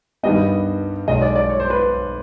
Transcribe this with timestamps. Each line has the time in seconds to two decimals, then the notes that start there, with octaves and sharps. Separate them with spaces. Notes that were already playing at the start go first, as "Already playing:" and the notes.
0.23 G2 D#3 G3 B3 D#5
1.08 B1 B2 G#3 D#5
1.22 D5
1.36 D5
1.49 C#5
1.60 C5
1.70 B4